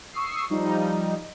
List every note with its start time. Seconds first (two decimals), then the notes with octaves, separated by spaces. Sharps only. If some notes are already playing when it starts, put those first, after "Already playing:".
0.13 C#6 D#6 E6 C7
0.50 F3 G3 D#4